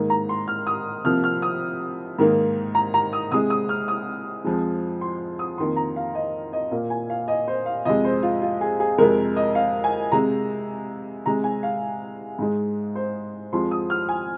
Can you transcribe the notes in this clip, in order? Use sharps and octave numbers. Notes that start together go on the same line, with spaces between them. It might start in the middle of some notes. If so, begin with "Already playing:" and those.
Already playing: G#2 D#3 A#3
A#5
C6
F6
D#6
C3 F3 A#3 F6
F6
D#6
G#2 D#3 A#3
A#5
A#5
D#6
C3 G#3 D#6
D#6
F6
D#6
F2 F3 G#3
C6
D#6
F2 D#3 A#3 C6
A#5
F5
D#5
D#5
A#2 A#3 F5
G#5
F5
D#5
C5
F5
F2 C3 G#3 D#5
C5
F4
F4
G#4
G#4
F2 C3 G#3 A#4
D#5
F5
G#5
C3 G#3 A#5
C3 G#3 A#5
G#5
F5
G#2 G#3
C5
F2 F3 G#3 C6
D#6
F6
G#5